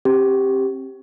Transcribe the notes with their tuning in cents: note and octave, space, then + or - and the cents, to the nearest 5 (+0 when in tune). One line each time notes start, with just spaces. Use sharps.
C4 +30 G4 +0